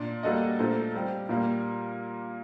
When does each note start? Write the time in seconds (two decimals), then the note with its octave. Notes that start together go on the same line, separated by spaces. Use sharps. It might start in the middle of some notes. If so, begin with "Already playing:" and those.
Already playing: A#2 D4
0.23 G3 A#3 F#4 A4 D#5
0.59 A#2 A3 D4 A4 C5
0.95 G3 C4 G4
1.29 A#2 G3 A#3